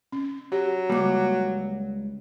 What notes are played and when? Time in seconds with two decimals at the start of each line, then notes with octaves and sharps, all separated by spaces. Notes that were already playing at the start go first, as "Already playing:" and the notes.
0.12 C#4
0.52 F#3 G4
0.90 C#2 G3 A#3 D6